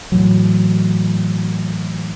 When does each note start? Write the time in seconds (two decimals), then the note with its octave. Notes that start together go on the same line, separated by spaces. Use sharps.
0.12 A2 E3 F#3